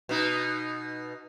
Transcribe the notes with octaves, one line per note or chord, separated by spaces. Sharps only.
B2 D#4